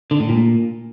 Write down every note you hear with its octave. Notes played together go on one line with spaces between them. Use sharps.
D3
A2
A#2